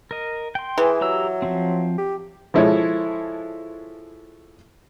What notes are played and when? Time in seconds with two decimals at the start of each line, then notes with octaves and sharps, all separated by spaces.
0.11 A#4 D#5
0.55 G5 C6
0.78 E3 G#4
1.01 F#3 G4 A#5 E6
1.42 F3 C4
1.98 G4
2.54 F3 G#3 E4 A4 C#5